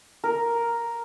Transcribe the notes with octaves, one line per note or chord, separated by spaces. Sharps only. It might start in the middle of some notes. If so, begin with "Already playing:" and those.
A#4